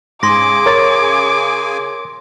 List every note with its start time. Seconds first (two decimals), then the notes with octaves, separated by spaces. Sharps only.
0.23 G#2 C#3 G#4 G#5 C6 D6 A#6
0.66 A#4 C#5 A6